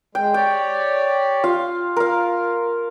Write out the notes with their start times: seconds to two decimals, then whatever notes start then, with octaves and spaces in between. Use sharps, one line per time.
0.15 G#3 G5
0.34 G4 C#5 D5 G5
1.44 F4 F5
1.97 F4 A#4 F5